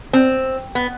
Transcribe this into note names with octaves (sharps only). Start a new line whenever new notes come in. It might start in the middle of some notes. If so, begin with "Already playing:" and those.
C4
B3